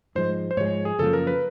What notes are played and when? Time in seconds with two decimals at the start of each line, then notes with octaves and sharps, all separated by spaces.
0.15 G#2 F3 G#3 C5
0.51 C5
0.57 G#2 F3 G#3 C#5
0.85 G#4
0.98 F#2 C#3 F3 A#3 A4
1.13 A#4
1.27 B4